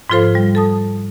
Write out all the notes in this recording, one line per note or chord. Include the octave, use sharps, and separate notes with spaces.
G#2 F3 F4 A4 C5 F5
G3
A4 A5 D#6